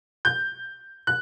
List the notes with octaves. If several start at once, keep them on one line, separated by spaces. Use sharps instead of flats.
G6
F#6